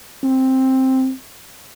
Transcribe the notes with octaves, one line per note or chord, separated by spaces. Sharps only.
C4